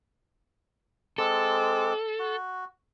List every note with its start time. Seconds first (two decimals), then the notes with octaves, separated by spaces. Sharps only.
1.18 G#3 C4 A4 D6
2.19 F#4